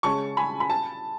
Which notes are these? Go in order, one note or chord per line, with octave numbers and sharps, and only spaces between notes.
C#3 G#3 C#4 A5 C#6
G#5 B5
B5
A5